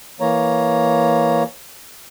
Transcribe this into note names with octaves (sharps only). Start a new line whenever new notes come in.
E3 A#3 C#5 A#5